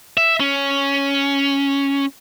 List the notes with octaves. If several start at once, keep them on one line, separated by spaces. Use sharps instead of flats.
E5
C#4